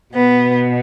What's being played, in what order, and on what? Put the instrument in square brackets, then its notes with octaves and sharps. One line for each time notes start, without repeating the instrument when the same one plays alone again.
[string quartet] B2 B3